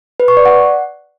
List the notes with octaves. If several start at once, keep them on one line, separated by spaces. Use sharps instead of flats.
B4
C#6
D5
F#5